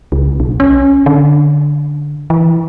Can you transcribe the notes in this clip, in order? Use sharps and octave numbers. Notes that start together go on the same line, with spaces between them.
C#2
B1
C#4
D3
E3